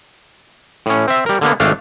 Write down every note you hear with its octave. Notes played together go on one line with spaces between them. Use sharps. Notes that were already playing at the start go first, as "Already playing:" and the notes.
A2 C#4
C4 E5
G3 A#4
D3 A#3 B3
G#1 A3 D4 F5